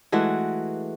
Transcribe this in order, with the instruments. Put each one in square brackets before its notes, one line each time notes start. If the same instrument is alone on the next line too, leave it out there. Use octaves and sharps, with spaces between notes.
[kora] E3 G#3 A3 F#4